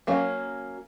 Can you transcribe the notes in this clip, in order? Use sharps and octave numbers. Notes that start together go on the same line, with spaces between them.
F#3 A#3 C#4